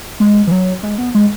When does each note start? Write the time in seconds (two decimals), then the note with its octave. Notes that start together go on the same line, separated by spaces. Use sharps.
0.20 G#3
0.47 E3
0.52 F#3
0.83 G#3
0.98 B3
1.15 G#3